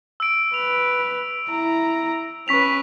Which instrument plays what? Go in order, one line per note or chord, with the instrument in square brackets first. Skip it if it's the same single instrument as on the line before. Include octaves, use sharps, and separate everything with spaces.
[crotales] E6 D7
[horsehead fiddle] B4 [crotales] F7
[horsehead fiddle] E4 A#5
[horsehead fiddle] C#4 B4 [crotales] C#6 B6 F7